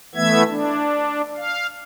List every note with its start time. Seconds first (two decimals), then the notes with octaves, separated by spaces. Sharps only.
0.15 E3 A3 B3 E5 G#6
0.49 D4
1.36 F5